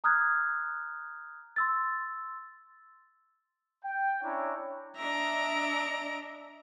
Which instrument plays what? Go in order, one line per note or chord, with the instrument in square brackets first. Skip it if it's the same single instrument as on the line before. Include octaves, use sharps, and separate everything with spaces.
[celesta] A#5 D#6 F6 F#6 G#6
C6 E6 A6
[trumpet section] G5
C#4 D4 E4 C#5 A#5
[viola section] D4 D#5 E5 [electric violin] A#5 D7